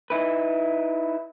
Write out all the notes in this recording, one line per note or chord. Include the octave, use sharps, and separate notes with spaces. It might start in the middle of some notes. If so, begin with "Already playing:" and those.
D#4 E4 B4